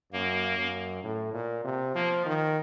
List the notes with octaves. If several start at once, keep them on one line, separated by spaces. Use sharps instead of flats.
F#2 A#3
F#2
A2
A#2
C3
F3 A#3
D#3